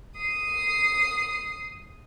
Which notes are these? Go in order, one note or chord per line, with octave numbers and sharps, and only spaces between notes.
D#6 C7